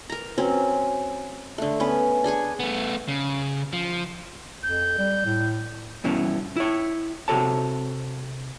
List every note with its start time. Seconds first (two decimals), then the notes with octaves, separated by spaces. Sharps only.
0.10 A#4 A#5
0.38 F#3 C4 C#4
1.58 D3 A3
1.80 B3 C#4 B4
2.24 D4 G#4 G#5 C#6
2.60 A3 B3
3.08 C#3
3.73 F3
4.63 F2 G6
4.98 G3
5.25 A2
6.04 G2 B2 E3 C#4
6.56 E4 C#5
7.28 C3 F#4 A4 C#5 A5